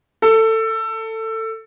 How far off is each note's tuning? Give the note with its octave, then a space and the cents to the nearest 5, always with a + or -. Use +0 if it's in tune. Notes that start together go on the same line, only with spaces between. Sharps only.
A4 +20